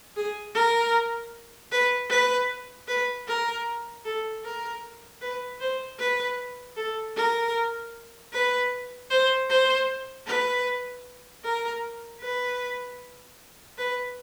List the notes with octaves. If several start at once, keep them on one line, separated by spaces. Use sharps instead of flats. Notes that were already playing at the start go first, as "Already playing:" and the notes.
G#4
A#4
B4
B4
B4
A#4
A4
A#4
B4
C5
B4
A4
A#4
B4
C5
C5
B4
A#4
B4
B4